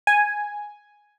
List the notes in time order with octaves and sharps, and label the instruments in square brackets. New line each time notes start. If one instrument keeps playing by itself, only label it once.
[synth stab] G#5